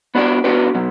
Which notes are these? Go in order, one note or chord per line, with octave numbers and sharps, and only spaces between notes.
B3 D4 F#4 B4 D5
B3 D4 F#4 B4 D5
B2 F#3